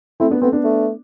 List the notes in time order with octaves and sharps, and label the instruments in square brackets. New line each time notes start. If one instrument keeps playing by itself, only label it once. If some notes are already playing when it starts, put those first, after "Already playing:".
[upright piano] A3 C4 [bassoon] E4
[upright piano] B3 D4
[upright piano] A3 C4 [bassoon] B3
[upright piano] B3 D4
[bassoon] A3